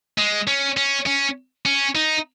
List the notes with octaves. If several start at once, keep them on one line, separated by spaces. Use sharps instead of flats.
G#3
C#4
C#4
C#4
C#4
D#4